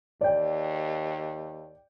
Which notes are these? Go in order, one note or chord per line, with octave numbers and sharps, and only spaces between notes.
D#2 D5 G5